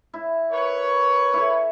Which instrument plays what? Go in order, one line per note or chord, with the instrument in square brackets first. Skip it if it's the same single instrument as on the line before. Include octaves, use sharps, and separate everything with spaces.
[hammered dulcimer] E4
[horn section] A#4 B4 C#5
[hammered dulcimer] E4 A4